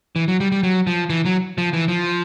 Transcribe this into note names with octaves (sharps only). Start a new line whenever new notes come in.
E3
F#3
G3
G3
F#3
F3
E3
F#3
F3
E3
F3